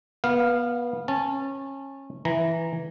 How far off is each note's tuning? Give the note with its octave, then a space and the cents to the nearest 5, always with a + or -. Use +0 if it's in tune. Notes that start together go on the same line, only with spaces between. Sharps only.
B3 -25 F5 +0
C#4 -25 A5 +0
E3 +0 A#5 +0